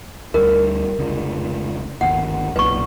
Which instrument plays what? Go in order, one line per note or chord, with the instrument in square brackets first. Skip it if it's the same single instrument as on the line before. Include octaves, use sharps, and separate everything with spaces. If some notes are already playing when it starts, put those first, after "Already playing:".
[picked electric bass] D2 G3 [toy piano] A#4
[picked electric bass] F1 C#2 D3
[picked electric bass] G1 D#2 [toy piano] F#5
[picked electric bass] F#1 B1 A#2 [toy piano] B4 C#6